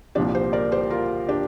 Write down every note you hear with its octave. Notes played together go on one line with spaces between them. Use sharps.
C2 A#2 F3 D4 G4
G4 C5
A#4 D5
G4 C5
F4 A#4
D4 G4